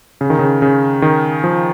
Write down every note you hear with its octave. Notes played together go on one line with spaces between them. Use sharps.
C#3
D#3
C#3
C#3
D#3
F3